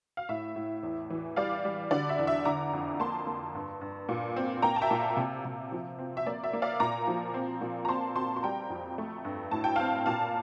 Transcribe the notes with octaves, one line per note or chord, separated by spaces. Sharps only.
F5
A2 E5
A2
E2
E3
G3 D5 F5
G3
D3 D5
E5
E2
E5
D3 A#5 D6
F2
A#3 A5 C6
A#3
G2
G2
A#2
C4
A#3 G5 A#5
A5
E5 G5
A#2
C3
C3
F3
C4
E5
A#3 D5
E5
A#3
D5 F5
A#2 A#5 D6
F3
C4
A#2
A#5
C4 A5 C6
C4 A5 C6
C6
G3 G5 A#5
F2
A3
G2
A2 A5
G5
C4 F5 A5
A#2 F5 A5